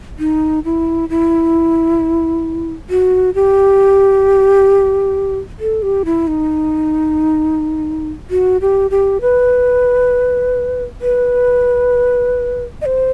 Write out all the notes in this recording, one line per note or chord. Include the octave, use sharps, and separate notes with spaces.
D#4
E4
E4
F#4
G4
A4
G4
E4
D#4
F#4
G4
G4
B4
B4
D#5
C5